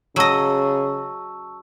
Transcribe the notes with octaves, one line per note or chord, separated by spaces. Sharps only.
C#3 F#3 D#5 A5 C#6 E6